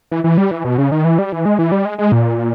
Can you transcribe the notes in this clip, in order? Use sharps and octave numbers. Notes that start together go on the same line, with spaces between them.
E3
E3
G3
E3
B2
C#3
D#3
E3
G3
E3
G#3
E3
G3
G#3
G#3
A#2